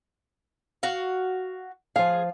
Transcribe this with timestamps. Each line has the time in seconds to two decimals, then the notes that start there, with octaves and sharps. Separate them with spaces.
0.83 F#4 F5
1.96 F3 G#4 F5